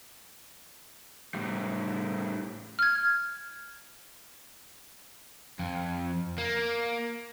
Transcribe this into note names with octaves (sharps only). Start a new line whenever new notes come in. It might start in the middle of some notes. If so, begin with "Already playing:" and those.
A2 G3
F6 G#6
F2
A#3